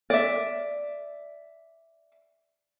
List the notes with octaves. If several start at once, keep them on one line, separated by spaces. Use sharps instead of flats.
D5 E5